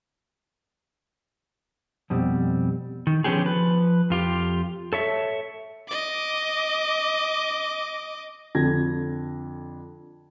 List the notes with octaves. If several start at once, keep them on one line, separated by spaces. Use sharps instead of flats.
F2 B2 G3 C4
D#3
D3 F3 B3 C#4 G4 G#4
F3 B4
F2 F4 G4
A4 C#5 E5
D#5 D6
F2 D3 G#6 A#6